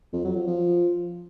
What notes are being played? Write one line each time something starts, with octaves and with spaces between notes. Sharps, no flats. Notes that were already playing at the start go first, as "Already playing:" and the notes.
F2
F#3
F3
F3